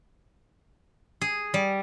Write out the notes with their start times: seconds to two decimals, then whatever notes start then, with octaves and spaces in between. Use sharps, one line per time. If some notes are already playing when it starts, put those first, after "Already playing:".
1.21 G#4
1.54 G3